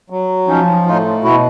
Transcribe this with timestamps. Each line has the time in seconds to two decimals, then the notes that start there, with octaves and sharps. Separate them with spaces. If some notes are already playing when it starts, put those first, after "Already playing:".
0.10 F#3
0.48 F3 C#4 D#4
0.86 A2 D#4 F4
1.24 B2 E4 F#4